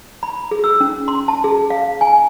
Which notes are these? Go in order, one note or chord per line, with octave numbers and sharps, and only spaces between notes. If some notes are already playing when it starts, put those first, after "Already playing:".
B5
G#4
E6
C#4
C6
A5
G#4
F5
G#5